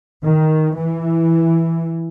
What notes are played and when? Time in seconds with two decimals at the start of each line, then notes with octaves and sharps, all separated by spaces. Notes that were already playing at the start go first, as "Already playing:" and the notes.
0.23 D#3
0.76 E3